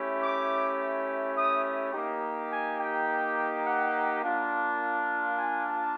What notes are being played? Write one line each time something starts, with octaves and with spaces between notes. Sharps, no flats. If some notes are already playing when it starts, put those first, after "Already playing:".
Already playing: A3 C#4 E4 G4
D6
D#6
A#3 D#4 G4
G#5
G5
F#5
A#3 D4 F4
G#5
A5